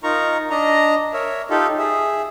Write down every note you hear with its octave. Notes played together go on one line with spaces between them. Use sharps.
D#4 F4 A#4 A#5 C#6
D4 D#5 A#5
A#4 C#5 E5
D#4 F4 G4 A4
G#4 E5